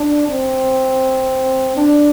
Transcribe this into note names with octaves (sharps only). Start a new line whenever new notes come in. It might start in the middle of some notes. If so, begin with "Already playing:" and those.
Already playing: D4
C4
D4